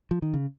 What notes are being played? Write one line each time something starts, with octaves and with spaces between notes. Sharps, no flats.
F3
D#3
C#3